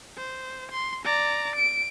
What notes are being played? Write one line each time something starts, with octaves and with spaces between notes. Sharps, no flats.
C5
C6
D5 A#5
D7